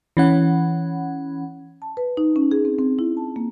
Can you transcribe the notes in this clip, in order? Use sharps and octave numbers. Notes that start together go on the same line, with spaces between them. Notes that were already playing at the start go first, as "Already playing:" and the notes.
E3 C#4 F#5
A5
B4
D#4
C#4
G#4
C4
C4
E4
A5
A#3